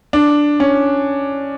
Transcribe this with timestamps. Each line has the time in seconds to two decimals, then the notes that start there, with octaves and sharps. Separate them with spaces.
0.13 D4
0.60 C#4